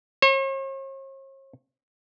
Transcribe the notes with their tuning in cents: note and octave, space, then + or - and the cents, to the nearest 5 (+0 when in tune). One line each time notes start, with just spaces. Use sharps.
C#5 -45